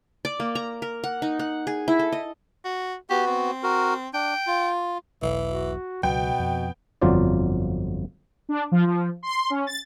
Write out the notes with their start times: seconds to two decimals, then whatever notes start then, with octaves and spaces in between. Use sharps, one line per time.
0.25 D5
0.40 A#3
0.55 A#5
0.82 A#4
1.04 F#5
1.22 D#4
1.39 F#5
1.67 G#4
1.88 E4
1.99 A4
2.12 D#5
2.65 F#4
3.10 B3 F#4 G4
3.27 C4
3.63 F#4 A#4
4.14 D4 G5
4.47 F4
5.22 E1 B1 E3
5.48 F#4
6.03 C#2 B2 F#3 B3 G5
6.39 F2
7.02 G1 F2 F#3 F4 C5 D5
8.49 D4
8.72 F3
8.86 F3
9.23 C6
9.50 C#4
9.67 A6